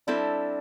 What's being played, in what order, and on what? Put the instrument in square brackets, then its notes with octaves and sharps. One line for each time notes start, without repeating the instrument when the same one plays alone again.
[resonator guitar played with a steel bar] G3 C4 E4 A4 [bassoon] D4